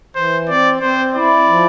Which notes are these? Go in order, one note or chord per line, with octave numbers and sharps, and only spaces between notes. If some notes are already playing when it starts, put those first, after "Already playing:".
E3 C5
C4 D5
C4 C5
E4 D5
F3